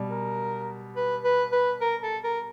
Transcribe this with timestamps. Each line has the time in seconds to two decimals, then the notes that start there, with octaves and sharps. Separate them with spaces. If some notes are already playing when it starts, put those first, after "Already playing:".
Already playing: B2 G3
0.10 A#4
0.96 B4
1.24 B4
1.52 B4
1.81 A#4
2.03 A4
2.24 A#4